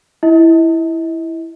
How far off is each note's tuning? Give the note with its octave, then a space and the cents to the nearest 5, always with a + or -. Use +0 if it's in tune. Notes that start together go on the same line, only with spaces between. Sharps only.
E4 +0 D#5 +40